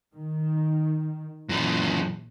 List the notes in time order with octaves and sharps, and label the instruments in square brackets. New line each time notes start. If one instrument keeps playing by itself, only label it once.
[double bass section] D#3
[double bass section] A#1 [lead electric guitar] F#2 E3